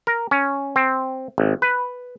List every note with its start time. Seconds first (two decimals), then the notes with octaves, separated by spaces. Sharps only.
0.07 A#4
0.31 C#4
0.76 C4
1.38 G#1
1.62 B4